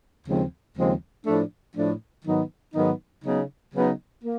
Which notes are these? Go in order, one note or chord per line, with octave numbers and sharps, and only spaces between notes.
D#2 C#3 F3 G#3 C4
D#2 C#3 F3 G#3 C4
A2 F3 A3 D4
A2 F3 A3 D4
G#2 D#3 F#3 B3 D#4
G#2 D#3 F#3 B3 D#4
C#3 F#3 B3 D#4
C#3 F#3 B3 D#4
A#3